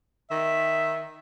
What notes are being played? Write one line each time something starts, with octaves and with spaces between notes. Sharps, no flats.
D#3 E5